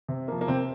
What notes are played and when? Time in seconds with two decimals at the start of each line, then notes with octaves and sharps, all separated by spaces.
0.08 C3
0.28 F3 A#3
0.41 A#3
0.48 C3 C4